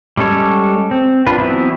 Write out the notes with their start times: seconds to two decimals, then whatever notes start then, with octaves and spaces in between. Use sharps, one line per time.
0.17 G3 G#3 C#4 A4 C#5
0.91 C4
1.26 D4 F4 B4
1.38 E3 F#3 B3 C4 E4